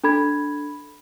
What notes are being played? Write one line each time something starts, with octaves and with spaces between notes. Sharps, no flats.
D4 A4 B5 G#6